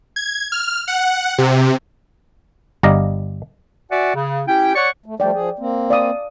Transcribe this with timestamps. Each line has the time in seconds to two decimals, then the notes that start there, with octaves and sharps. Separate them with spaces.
0.16 G#6
0.52 F6
0.88 F#5
1.38 C3
2.83 G1 G3 D5 D#5 F5 A#5
3.91 F#4 D5 E5 F#5 G#5
4.15 C#3
4.48 C#4 E4 G4 G5
4.75 C#5 D5 F#5 C#6
5.06 A3
5.20 F3 G3 A3 D5 G5
5.34 F3 G#4
5.59 A#3 C4
5.90 D5 F5 D#6